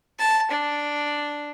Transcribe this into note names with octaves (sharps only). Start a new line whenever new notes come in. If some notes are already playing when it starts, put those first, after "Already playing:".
A5
D4